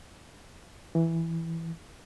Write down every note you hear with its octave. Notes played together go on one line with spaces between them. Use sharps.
E3